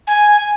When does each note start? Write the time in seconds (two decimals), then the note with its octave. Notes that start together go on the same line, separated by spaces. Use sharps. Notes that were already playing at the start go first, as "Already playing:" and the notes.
0.07 G#5